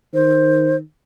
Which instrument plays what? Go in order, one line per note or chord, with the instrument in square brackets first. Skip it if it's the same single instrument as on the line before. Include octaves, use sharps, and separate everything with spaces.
[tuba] D#3 [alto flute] C5